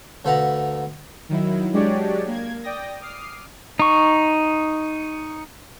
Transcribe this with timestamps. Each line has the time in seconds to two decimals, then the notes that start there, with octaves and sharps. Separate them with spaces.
0.25 D2 A4 B4 F5 F#5 A#5
1.29 D#3 F#3 E4
1.73 F#3 G#3 D4 G4 C#5 D5
2.27 A#3 G#6
2.63 D5 G5 D#6 A#6
3.00 D6 D#6 F6 C7
3.79 D#4 C#6